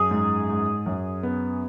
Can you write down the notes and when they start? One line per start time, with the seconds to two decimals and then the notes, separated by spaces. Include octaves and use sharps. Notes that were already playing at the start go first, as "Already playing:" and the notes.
Already playing: F#2 G#4
0.11 G#2
0.49 G#2
0.86 F#2
1.23 B3